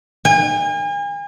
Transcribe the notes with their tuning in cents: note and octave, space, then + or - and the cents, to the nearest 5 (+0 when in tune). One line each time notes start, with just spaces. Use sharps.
G#5 -40